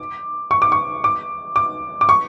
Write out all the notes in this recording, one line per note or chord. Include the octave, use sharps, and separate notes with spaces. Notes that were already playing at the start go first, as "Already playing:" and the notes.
Already playing: D6
C#6
D6
C#6
D6
D6
D6
C#6